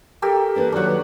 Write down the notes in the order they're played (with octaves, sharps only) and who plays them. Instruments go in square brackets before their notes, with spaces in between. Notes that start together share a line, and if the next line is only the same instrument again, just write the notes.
[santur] G4 A4 A#4
[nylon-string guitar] E3 A#3 D4 [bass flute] B4
[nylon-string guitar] D#3 F#3 [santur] D4 F#5